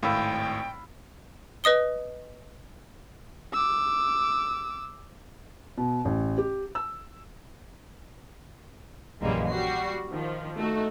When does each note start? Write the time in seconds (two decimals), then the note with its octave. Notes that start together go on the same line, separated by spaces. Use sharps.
0.03 G#1 A2 F5 G5 B5 E6
1.64 B4 D#5 D#6 G7
3.53 D6 E6
5.78 B2
6.05 A1
6.38 G4
6.75 E6
9.22 A#1 F#2 E3 G3 G#3 A#3
9.51 G3 F#4 C7
10.10 D#3 F3
10.57 A3 D#4 F#4